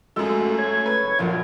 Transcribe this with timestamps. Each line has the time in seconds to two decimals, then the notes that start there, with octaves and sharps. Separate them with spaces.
0.16 F#2 G#3 A3 F4 F#4 A4 E6
0.58 C#5 G#6
0.86 B4
1.04 F#1
1.19 A#1 F#2 F4